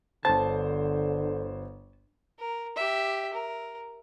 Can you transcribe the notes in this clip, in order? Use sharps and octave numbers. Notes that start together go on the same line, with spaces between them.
G1 D3 C5 A5
A#4
G4 E5
A#4